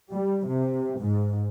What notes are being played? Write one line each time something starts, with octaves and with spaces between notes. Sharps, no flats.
G3
C3
G#2